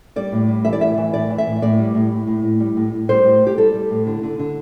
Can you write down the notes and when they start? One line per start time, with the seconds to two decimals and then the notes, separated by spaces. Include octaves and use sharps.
0.16 G3 D5
0.32 A2
0.48 G3
0.65 E3 E5
0.73 D5
0.81 A2 E5
0.98 E3
1.14 A2 D5
1.30 E3
1.38 E5
1.46 A2
1.62 A2 D5
1.79 G3
1.95 A2
2.11 A2
2.27 A2
2.43 A2
2.60 G3
2.77 A2
2.92 A2
3.09 G3 C5
3.25 A2
3.41 G3
3.47 G4
3.58 G3 A4
3.74 G3
3.90 A2
4.07 D3
4.23 D3
4.39 D3